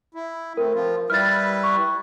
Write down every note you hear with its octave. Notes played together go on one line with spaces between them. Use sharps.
E4
A3 C4 A#4
F3 F4
G3 E4 B4 F6 A6
C#6